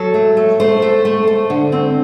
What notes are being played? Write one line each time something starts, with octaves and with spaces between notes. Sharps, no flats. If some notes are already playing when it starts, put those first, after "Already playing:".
Already playing: F#3 A4
A3
A3
A3 C5
A3
A3
A3
D3
C4